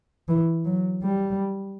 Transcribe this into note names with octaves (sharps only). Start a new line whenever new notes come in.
E3
F#3
G3